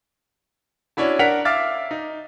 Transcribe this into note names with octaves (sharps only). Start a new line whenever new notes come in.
C#4 D4 E4 F#4
D4 A#4 F#5 B6 F7
E5 F5 D6 F6 A6
D#4